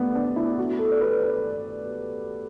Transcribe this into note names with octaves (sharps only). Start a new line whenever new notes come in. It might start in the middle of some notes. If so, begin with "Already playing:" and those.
Already playing: A3 B3 D4
D4
E4
F#4
A4
D5
B4
D5